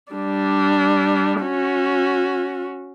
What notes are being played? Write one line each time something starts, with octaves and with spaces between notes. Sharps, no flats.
G3 D4
C#4 F#4